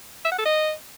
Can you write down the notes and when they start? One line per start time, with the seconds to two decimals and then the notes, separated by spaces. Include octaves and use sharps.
0.25 E5
0.32 F#5
0.38 A4
0.45 D#5